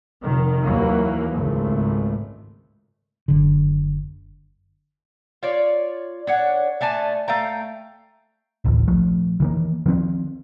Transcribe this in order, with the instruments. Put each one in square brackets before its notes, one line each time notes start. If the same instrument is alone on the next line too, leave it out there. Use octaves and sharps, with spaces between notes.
[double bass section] F1 D#3
D#2 E3 F#3 A#3
G#1 C#2 A3
[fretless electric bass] F#1 D3
[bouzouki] F4 C#5 D5
D4 C#5 F#5
A3 D4 G#5 A5
A3 F5 G5 A#5
[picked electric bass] D1 A1 D#2
A#1 F3 A3
D#3 E3 A#3
D#3 F3 B3 C4